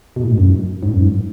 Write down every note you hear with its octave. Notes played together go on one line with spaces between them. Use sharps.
B2
A2
G#2
F#2
G#2
F#2
G#2